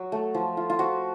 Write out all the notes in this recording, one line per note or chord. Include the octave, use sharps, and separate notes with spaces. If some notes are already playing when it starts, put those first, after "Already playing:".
Already playing: F#3 F#4
A3
F3
F4
F4
F3 F#4